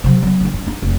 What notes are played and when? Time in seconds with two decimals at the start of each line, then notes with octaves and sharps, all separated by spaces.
0.04 C3 F#3
0.23 F#3 B3
0.41 D3 E3
0.54 G2
0.67 B3 D#4
0.82 F1